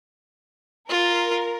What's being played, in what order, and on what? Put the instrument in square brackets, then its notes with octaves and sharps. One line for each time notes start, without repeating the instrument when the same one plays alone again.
[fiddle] F4 [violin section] A#4